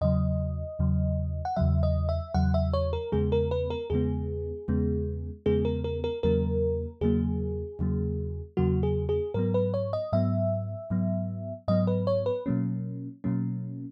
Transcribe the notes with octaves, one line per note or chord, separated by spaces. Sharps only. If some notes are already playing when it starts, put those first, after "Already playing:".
E2 C#3 F#3 D#5
E2 C#3 F#3
F#5
E2 C#3 F#3 E5
D#5
E5
E2 C#3 F#3 F#5
E5
C#5
A#4
E2 C#3 G#3 B3 G#4
A#4
B4
A#4
E2 C#3 G#3 B3 G#4
E2 C#3 G#3 B3
E2 C#3 G#3 B3 G#4
A#4
A#4
A#4
E2 C#3 F#3 A#3 A#4
E2 C#3 F#3 A#3 G#4
E2 C#3 F#3 A#3
E2 C#3 F#3 A#3 F#4
G#4
G#4
G#2 F#3 B3 A#4
B4
C#5
D#5
G#2 F#3 B3 E5
G#2 F#3 B3
G#2 F#3 B3 D#5
B4
C#5
B4
B2 F#3 A#3 C#4
B2 F#3 A#3 C#4